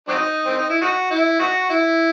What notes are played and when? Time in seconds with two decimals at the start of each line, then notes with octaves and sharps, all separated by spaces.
0.08 F#3 C4 D#4
0.46 C4
0.58 D#4
0.70 E4
0.81 D#4 F#4
1.11 E4
1.40 D#4 F#4
1.70 E4